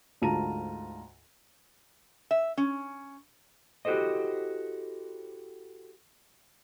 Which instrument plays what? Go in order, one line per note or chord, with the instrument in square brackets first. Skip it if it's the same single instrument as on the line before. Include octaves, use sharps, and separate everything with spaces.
[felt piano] D2 G#2 F4 A5 A#5 D#7
[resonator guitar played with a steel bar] E5
C#4
[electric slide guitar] E4 F#4 G4 A4 C5 D#5